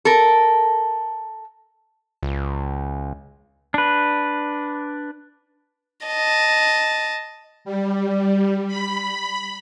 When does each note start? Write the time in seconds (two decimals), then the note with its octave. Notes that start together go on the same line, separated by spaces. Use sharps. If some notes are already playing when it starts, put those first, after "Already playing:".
0.05 A4 A#4
2.23 C#2
3.74 D4 B4
6.06 D#5 A5
7.65 G3
8.68 B5